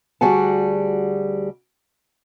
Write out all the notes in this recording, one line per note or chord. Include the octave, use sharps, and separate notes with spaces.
D2 G3 F#4 G#4 F#5 A5